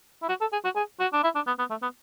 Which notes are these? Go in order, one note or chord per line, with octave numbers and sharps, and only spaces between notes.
E4
F#4
A4
G#4
F#4
G#4
F#4
D4
E4
D4
B3
B3
A3
B3